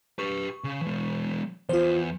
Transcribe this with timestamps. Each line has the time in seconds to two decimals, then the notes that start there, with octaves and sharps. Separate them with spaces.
0.19 G4 B4 C#6
0.64 C#3
0.82 E3 G#3
1.69 E2 F4 C5